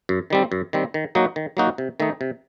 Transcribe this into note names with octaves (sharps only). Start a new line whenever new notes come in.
F#2
D#3 G3 C4
F#2
D#3 G3 C4
D#3
F#3 A#3 D#4 F#4
D#3
F#3 A#3 D#4 F#4
C3
D#3 A3 D#4
C3